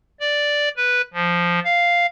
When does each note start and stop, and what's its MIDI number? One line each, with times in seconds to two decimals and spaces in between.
0.20 0.69 74
0.77 1.02 71
1.14 1.60 53
1.64 2.06 77